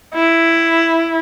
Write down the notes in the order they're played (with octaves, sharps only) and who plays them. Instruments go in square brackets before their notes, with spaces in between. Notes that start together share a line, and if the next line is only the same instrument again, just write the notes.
[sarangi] E4